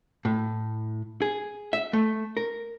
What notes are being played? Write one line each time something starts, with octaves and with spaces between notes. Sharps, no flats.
A2
G#4
E5
A3
A#4